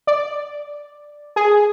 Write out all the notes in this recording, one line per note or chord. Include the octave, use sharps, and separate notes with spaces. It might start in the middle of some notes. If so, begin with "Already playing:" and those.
D5
G#4